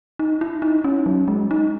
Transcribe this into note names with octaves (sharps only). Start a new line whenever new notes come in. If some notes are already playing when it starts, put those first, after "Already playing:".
D#4
E4
D#4
C#4
F#3
G#3
D#4